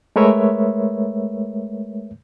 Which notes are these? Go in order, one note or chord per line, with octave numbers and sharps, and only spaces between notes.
G#3 A3 A#4 B4 C#5 E5